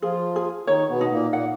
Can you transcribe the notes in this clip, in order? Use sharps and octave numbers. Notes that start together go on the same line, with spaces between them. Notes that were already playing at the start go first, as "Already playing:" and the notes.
F3 F4 G#4
G#4
D#3 D#4 C#5
B2 B3
D#4
A#2 A#3
A#2 A#3 F#5